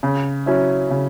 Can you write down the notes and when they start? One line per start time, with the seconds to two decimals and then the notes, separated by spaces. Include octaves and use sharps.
0.03 C#3
0.46 F#3 C#4 E4
0.90 C#3